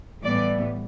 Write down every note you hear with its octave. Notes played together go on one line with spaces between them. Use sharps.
A2 E3 G3 B3 D5